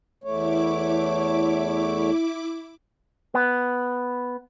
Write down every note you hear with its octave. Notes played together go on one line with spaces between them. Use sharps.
E2 A3 E4 C#5 D6
B3